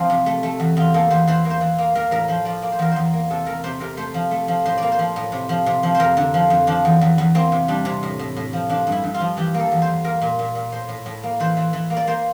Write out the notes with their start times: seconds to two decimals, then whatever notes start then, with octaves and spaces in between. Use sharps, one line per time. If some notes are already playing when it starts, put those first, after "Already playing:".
Already playing: F3 C4
0.10 C3
0.26 A3
0.43 A3
0.60 E2
0.77 E2 F4
0.94 A#3 A4
1.10 E2 C5
1.27 E3 C5
1.45 A#3
1.50 C5
1.61 E3
1.78 A#3
1.95 A#3 A#4
2.11 A2 A#4
2.28 F3 C5
2.45 F3 D5
2.62 A#3 D5
2.72 C5
2.79 E2 A#4
2.91 E2 C5
3.13 A#3
3.30 C3 A4
3.46 A3 A#4
3.64 C3 C5
3.80 C3 A#4
3.97 A3 C5
4.14 F3
4.31 A3
4.48 F3
4.66 A2 C5
4.78 A#3 D5
4.92 C5
4.99 F3
5.16 A2
5.32 C3
5.49 F3
5.66 C3
5.83 F3
5.95 C5
6.00 F2 A#4
6.17 D3
6.34 F3
6.50 F2
6.67 F3 D4
6.85 E2
7.01 E2
7.18 E2
7.35 A#3 C4
7.52 C3
7.68 G3 D4
7.85 C3
8.03 A2
8.19 A2
8.37 A2
8.53 F3
8.69 F3 D4
8.87 G2
8.92 E4
9.04 G2
9.14 F4
9.20 F3
9.37 E3 G4
9.54 A#3
9.60 A4
9.72 E2
9.82 C5
9.87 E2
10.04 A#3 A#4
10.22 A#2
10.39 A#2
10.55 A#2
10.72 A2 C5
10.89 A2
11.06 A2
11.23 A#3
11.40 E3 C5
11.57 E3
11.73 E3
11.90 A#3
11.97 D5
12.07 A#3 C5